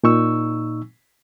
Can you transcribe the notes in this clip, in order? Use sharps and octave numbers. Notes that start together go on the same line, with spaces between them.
A#2 D#4 C#6 E6